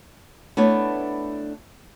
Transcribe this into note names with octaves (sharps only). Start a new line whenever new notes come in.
A3 B3 D4 E4 C#5